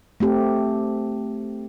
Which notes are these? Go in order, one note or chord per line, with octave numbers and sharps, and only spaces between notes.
A3 C4 G4